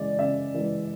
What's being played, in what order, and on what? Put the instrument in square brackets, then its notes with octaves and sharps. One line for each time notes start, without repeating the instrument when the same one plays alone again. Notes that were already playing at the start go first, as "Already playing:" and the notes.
Already playing: [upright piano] C#3 E3 G#3 D5
C#3 E5
E3 G#3